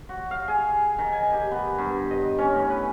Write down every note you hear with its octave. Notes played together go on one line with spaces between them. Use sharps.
F#4
F5
G#4
D#3
G#5
G4
B3
G2
D#5
C#4
A2
B4